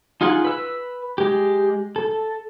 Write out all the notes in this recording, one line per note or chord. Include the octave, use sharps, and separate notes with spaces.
D#4 F4 G#4 F#5
B4 E6
G#3 G4
A4